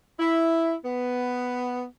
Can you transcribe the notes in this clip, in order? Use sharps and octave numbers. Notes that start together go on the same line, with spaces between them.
E4
B3